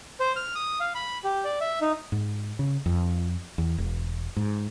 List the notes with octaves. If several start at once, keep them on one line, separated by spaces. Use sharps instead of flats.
C5
F6
D#6
F5
B5
G4
D5
E5
D#4
G#2
C#3
F2
E2
E1
G#2